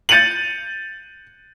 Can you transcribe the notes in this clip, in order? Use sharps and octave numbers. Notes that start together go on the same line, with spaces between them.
G6 A6 C#7 D#7 F7 F#7